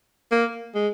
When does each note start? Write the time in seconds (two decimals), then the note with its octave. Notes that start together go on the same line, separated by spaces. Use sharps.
0.32 A#3
0.75 G#3